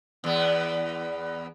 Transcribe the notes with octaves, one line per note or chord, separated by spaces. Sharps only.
E2 B3